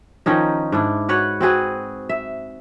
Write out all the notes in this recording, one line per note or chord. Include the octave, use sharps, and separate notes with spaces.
D#3 F3 C#4 D#4
G#2 D4 E4
F#4 B4 C#5 F#5
C4 F#4 G#4 B4
E5